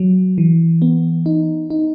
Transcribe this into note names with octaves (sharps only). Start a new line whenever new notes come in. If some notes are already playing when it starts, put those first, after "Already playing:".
Already playing: F#3
E3
B3
D#4
D#4